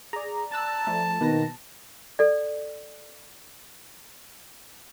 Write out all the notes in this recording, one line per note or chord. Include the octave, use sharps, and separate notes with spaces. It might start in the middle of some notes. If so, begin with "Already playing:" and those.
G#4 D5 A#5
A5 E6 F#6 A6
F3 A3
B2 D#3 A#3 B4 A#6
A4 D5